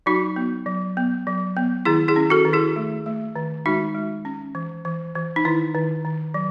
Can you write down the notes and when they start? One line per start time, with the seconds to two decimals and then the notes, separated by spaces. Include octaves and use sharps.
0.06 F#3 D#4 F#4
0.36 B3
0.66 F#3
0.97 B3
1.27 F#3
1.57 B3
1.85 D#3 E4 G#4
2.08 E4 G#4
2.16 C#4
2.30 F#4 A4
2.45 D#3
2.53 E4 G#4
2.76 A3
3.06 A3
3.36 D#3
3.66 G#3 D#4 F#4
3.95 G#3
4.25 C#4
4.55 E3
4.85 E3
5.15 E3
5.36 D#4
5.45 D#3 E4
5.75 D#3
6.05 D#3
6.34 F#3